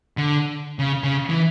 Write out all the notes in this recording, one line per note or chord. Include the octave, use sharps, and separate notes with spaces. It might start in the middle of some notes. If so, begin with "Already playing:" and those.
D3
C#3
C#3
E3